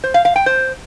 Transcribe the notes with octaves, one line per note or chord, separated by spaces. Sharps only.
C5
F5
F5
G5
C5